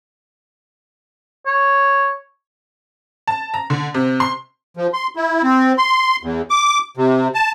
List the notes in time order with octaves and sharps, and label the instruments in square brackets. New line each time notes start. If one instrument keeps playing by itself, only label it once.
[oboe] C#5
[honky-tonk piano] A5
A#5
D3
C3
C6
[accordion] F3
C6
E4
C4
C6
E2
D6
C3
A5